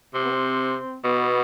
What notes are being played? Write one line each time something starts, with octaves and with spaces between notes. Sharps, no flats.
C3 C4
B3
C4
B2 B3